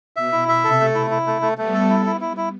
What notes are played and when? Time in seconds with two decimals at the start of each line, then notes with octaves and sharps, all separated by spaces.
0.16 B2 E5
0.32 E4
0.48 E5
0.64 C3 A4
0.80 A3
0.95 E4
1.11 E4
1.27 A3
1.42 A3
1.58 G3 A3 B3
1.74 A4
1.90 E4
2.06 E4
2.21 E4
2.37 E4